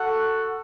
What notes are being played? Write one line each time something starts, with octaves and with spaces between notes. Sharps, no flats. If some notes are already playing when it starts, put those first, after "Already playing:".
Already playing: F#4 A4 F#5